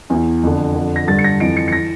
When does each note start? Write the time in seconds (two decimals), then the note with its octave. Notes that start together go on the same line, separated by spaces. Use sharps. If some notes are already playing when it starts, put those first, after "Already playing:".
0.10 E2
0.15 E3
0.43 F2 D3
0.75 F2 D3
0.96 A#6
1.07 G2 D3 A6
1.19 C#7
1.24 A#6
1.40 F2 E3 D7
1.57 C#7
1.68 C#7
1.72 E3 A#6